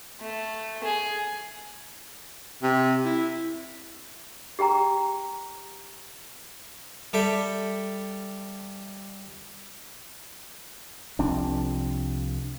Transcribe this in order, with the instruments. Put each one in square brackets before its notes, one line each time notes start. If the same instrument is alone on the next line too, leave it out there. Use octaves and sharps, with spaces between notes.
[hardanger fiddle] A3
G#4
[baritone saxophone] C3
E4
[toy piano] G4 G#4 G5 A#5
[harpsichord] G3 A4 E5 G5
[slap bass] C2 F3 C4 D4